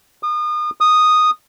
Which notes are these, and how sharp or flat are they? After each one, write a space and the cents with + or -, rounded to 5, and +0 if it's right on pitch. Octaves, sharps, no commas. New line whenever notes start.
D#6 -35
D#6 -5